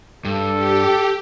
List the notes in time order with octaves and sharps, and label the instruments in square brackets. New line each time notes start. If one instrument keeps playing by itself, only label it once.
[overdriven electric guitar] G2 [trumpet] A4
[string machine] G4